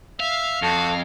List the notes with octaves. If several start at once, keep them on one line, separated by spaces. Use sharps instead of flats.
E5 F5
F2 F#4 A4